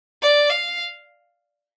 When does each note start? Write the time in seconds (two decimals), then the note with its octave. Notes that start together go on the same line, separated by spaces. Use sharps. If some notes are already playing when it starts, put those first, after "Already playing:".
0.22 D5
0.50 F5